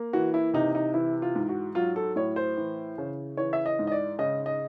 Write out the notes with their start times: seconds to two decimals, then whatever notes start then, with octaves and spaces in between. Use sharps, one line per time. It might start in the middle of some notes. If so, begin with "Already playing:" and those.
Already playing: A#3
0.13 E3 F#4
0.34 E4
0.54 C3 D#4
0.75 D#4
0.94 E3 E4
1.22 F4
1.36 G#2
1.49 F#4
1.75 F#3 F4
1.96 A4
2.16 A2 C#5
2.36 C5
2.57 E3
2.98 C#3
3.37 E3 C#5
3.53 E5
3.66 D#5
3.79 G#2
3.87 D#5
3.92 D5
4.19 C#3 D#5
4.46 D#5